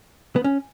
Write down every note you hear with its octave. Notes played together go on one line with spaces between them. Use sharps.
B3
C#4